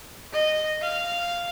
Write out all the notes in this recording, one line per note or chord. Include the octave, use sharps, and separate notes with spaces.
D#5
F5